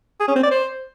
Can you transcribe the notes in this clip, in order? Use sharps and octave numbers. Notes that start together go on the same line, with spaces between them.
G#4
C#4
C4
D5
C5